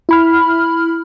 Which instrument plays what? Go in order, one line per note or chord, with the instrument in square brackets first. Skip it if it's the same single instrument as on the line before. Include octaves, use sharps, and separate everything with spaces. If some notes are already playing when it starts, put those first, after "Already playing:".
[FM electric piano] E4 B5 F6